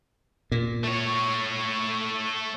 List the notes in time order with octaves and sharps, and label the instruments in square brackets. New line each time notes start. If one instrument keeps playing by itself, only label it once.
[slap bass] A#2
[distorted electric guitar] A3 C#5